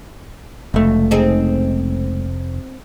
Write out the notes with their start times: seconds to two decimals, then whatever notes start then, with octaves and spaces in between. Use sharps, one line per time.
0.74 F1 C#2 A3
1.11 C4 D#4 G#4